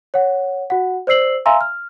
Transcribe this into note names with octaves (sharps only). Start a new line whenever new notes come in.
C#5 F#5
F#4 F#5
C5 D5 E6 C7 F#7
E5 F5 G#5 A#5 C6 E6
F6